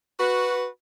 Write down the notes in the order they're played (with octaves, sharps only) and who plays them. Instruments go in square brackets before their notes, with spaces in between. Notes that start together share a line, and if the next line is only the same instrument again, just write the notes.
[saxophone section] F#4 B4